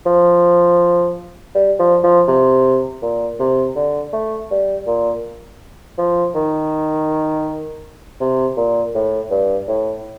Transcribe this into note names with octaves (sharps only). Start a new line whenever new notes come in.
F3
G3
F3
F3
C3
A#2
C3
D3
A3
G3
A#2
F3
D#3
C3
A#2
A2
G2
A2